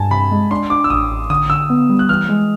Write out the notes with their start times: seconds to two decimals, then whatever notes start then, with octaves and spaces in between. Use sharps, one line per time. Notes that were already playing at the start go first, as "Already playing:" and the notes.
Already playing: G2 G#5 A5
0.11 C3 B5
0.31 G#3
0.51 D4 C6
0.70 D4 D6
0.84 E6
0.90 A1 D#6
1.10 A1
1.30 D3 D#6
1.50 D3 E6
1.70 B3
1.89 G3
1.99 F#6
2.09 E3 F6
2.29 G#3